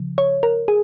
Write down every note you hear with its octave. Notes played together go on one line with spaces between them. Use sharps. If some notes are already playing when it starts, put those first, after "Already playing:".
Already playing: C#3 F3
C#5
A#4
G#4